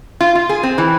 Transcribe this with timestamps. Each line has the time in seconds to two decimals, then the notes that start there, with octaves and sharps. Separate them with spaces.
0.21 F4
0.35 F4
0.49 G#4
0.63 C4
0.78 E3